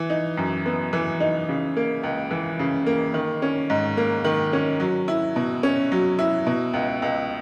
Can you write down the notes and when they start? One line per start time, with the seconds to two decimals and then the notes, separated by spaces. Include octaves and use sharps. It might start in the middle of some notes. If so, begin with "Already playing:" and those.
Already playing: E3
0.10 D#4
0.37 F#2
0.66 B3
0.93 E3
1.20 D#4
1.49 C#3
1.76 A#3
2.03 C#2
2.31 E3
2.59 C#3
2.86 A#3
3.14 D#3
3.42 C#4
3.70 G#2
3.97 A#3
4.24 D#3
4.53 C#4
4.80 F#3
5.08 E4
5.36 B2
5.63 C#4
5.92 F#3
6.19 E4
6.46 B2
6.73 C#2
7.02 C#2